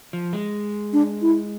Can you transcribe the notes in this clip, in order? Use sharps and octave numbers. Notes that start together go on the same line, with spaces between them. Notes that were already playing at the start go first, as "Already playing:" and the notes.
F3
G#3
D4
E4